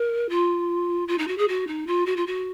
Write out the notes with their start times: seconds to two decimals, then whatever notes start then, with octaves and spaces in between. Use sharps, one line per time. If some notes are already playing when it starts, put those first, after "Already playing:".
Already playing: A#4
0.29 F4
1.08 F4
1.18 D#4
1.27 F#4
1.38 G#4
1.48 F#4
1.67 D#4
1.87 F4
2.06 F#4
2.16 F4
2.26 F#4